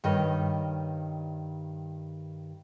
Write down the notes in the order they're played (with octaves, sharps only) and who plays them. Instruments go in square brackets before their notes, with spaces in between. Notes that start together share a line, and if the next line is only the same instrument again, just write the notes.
[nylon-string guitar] G2 D#3 C#5 D#5